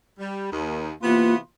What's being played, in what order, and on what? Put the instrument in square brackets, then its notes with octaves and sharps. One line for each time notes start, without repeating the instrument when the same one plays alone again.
[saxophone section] G3
D#2
[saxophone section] C3 E3 B3 [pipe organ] A#3 F4